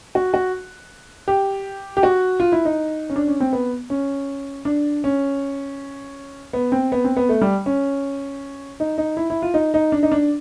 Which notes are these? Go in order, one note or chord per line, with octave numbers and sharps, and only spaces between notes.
F#4
F#4
G4
G4
F#4
F4
E4
D#4
C#4
D4
C#4
C4
B3
C#4
D4
C#4
B3
C4
B3
C4
B3
A3
G3
C#4
D#4
D#4
E4
E4
F4
D#4
D#4
D4
D#4
D4